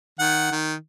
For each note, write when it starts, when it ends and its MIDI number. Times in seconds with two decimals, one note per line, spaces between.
0.19 0.51 51
0.19 0.51 78
0.51 0.74 51